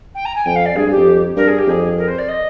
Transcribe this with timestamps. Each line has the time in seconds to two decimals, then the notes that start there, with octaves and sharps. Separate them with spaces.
0.14 G5
0.25 A#5
0.35 G#5
0.45 F2 G5
0.55 F5
0.65 D5
0.76 G2 G#4
0.86 G2
0.91 G4
0.96 F2
1.36 G2 A#4
1.48 G#4
1.58 G4
1.67 F2 G#4
1.97 A#4
2.08 C5
2.18 D5
2.28 D#5